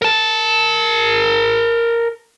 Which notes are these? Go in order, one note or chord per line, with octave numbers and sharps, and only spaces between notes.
A#4 A5